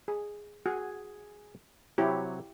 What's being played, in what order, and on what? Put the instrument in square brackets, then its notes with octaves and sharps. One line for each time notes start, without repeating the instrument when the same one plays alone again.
[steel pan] G#4
[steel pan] F#4 [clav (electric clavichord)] G#4 G#5
[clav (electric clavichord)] C3 F#3 C#5 [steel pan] E4 G4